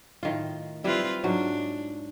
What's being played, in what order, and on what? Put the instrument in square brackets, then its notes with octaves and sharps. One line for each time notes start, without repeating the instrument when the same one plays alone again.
[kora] A2 D#3 F4
[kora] G3 E4 [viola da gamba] C4 F4 B4
[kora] G#2 F#3 [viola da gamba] D4